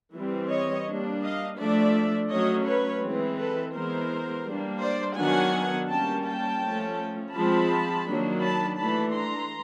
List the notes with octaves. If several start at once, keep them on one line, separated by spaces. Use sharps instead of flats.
E3 G3 C4
C#5 D#5
G3 A#3 D4
D#5 F5
F3 A3 D4 D5 E5
F#3 A3 C#4 C#5 D#5
B4 C#5
E3 G#3 C4
A4 B4
E3 G#3 B3 A#4 C5
G3 A#3 D4
C5 D5
D#3 F#3 B3 D4 F#5 G#5
G3 A#3 C#4 G5 A5
G5 A5
F3 A3 C#4
F3 G#3 C4 A5 B5
D#3 F#3 A#3 D4
A5 B5
E3 A3 D4 A5 B5
A#5 C6